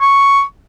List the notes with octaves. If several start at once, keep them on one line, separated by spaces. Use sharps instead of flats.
C#6